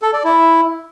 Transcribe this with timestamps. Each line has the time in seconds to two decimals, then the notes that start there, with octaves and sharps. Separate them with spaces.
0.02 A4
0.13 D5
0.24 E4